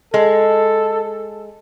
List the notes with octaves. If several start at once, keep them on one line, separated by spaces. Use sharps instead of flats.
G#3 A4